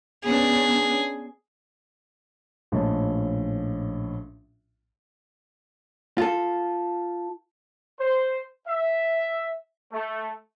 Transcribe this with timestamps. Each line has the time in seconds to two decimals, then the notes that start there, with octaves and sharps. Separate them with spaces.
0.24 B3 C#4 D4 G#4
2.72 A#1 A2 F3 C#4 D#5 A5
6.18 F4 A4
7.98 C5
8.67 E5
9.93 A3